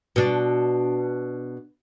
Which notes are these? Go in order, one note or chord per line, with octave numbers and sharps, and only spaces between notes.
B2 D4